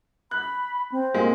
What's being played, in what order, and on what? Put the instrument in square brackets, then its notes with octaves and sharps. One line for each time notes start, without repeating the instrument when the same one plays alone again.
[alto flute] B5 [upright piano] F#6
[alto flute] C4
[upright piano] A#2 G#3 A#3